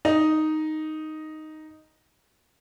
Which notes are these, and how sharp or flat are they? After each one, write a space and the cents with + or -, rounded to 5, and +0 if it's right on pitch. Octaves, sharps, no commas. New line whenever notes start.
D#4 +0 D#5 +0